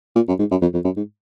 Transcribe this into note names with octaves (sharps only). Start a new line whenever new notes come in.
A#2
F#2
G#2
F#2
F2
F2
F#2
G#2